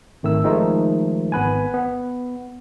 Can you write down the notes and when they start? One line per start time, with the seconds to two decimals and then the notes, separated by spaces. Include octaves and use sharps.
0.23 G#1 D#3 A3 E6
0.44 D#3 F3 G#3 A3 D#4
1.32 G#1 B3 B4 G#5
1.74 B3